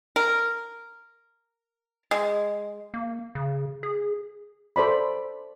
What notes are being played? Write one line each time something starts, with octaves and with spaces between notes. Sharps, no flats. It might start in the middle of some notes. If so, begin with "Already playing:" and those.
A#4
G#3
A#3
C#3
G#4
A4 C5 D5 B5